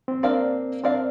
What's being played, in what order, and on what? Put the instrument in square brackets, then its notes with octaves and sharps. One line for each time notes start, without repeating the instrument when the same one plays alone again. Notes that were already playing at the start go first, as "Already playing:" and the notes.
[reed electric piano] C4
[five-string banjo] A#3 D4 A#4 D5 F5 [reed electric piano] C4
[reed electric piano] C4 [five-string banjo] D4 A#4 D5 F5